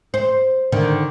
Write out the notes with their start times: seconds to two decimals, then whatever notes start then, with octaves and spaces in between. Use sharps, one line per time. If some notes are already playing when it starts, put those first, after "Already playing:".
0.14 C5
0.72 D3 D#3